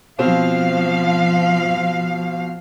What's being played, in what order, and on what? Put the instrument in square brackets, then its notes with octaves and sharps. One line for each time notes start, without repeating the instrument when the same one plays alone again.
[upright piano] B2 C4 [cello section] F3 F5